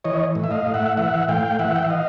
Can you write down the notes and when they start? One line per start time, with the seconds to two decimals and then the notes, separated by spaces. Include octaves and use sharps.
0.04 E3 C#5 D#5
0.35 A2
0.44 E5
0.51 D#5 F5
0.66 A2
0.74 E5 F#5
0.97 E3 E5 F#5
1.28 A2 F5 G5
1.59 E3 E5 F#5
1.75 G5
1.83 F#5
1.90 D#5 F5